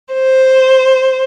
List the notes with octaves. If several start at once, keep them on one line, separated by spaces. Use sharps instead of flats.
C5